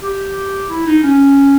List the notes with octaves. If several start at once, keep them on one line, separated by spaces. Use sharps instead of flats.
G4
E4
D#4
C#4